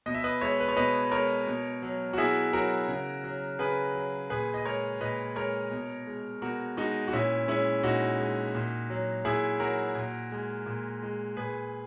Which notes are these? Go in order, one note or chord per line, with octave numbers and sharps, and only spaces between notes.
B2 D#5
E5
B4 D#5
G#3 C#5 E5
B4
C#5
B2 B4 D#5
G#3 A#4 C#5
B2
F#3
F#4
B2 E4 G#4
F#3 F#4 A#4
C#3
F#3
C#3 G#4 B4
F#3
A#2 G#4 B4
D#5
G#3 A#4 C#5
A#2 B4 D#5
G#3 A#4 C#5
B2
G#3
B2 F#4 A#4
G#3 D#4 F#4
F#4
A#2 C#4 E4
G#3 C#4 E4
A#2 D#4 F#4
G#3
A#2
F#3
A#2 E4 G#4
F#3 F#4 A#4
A#2
G#3
A#2
G#3
A#2 G#4 B4